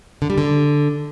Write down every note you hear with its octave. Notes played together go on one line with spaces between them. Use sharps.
D3
G3
D3